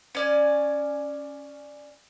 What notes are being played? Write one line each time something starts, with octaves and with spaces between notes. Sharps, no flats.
C#4 D5 G#5